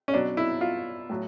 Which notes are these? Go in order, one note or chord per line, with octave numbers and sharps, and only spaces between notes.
C#4
B2 F#3 D4
E4
F4
A2 F#3